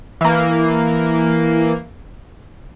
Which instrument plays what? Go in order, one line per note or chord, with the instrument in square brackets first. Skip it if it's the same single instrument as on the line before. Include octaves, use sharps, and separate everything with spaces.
[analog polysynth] E3 A#3